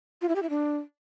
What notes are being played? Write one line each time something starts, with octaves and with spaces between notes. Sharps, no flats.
F4
E4
G4
E4
D4